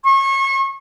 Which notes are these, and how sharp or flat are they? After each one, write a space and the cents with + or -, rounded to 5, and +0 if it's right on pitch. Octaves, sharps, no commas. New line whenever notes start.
C#6 -30